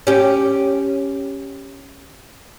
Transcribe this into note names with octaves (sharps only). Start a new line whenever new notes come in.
C#4 G4